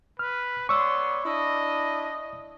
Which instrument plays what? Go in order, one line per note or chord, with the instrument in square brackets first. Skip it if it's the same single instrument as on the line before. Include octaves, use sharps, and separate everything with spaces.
[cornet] B4 [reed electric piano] F6
[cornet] B3 [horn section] C#5 D5 C6 [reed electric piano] C#6 E6
[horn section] D4 E4 [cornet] D#5